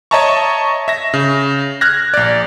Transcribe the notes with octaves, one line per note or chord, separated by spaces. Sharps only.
C#5 D#5 E5 A5 A#5 C#6
E5 A#6
C#3
F6 F#6 G#6 A#6
A#1 D5